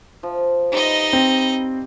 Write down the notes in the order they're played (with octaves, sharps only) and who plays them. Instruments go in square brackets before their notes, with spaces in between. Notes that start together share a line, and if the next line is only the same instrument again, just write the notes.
[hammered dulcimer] F3
[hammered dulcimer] G3 B4 C6 [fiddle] D#4 D#5
[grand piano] C4